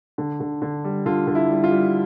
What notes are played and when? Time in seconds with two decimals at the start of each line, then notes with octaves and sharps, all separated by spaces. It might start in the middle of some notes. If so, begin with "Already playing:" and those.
0.18 D3
0.40 D3
0.62 D3
0.84 G3
1.06 D3 F4
1.27 D3
1.35 E4
1.50 G3
1.64 F4
1.71 G3